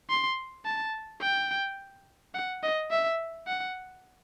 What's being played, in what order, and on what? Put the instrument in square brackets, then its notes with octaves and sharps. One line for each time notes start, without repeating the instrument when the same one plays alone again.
[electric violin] C6
A5
G5
F#5
D#5
E5
F#5